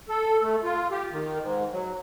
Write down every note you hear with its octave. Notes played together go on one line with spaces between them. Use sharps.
A4
A3
F4
G4
D#3
G#2
F#3